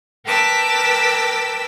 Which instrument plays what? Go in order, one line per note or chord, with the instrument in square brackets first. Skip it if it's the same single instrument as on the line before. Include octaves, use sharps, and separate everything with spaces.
[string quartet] A#4 B4 G5 A5 D6 E6